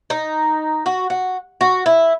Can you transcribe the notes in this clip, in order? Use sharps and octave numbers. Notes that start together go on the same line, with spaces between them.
D#4
F#4
F#4
F#4
E4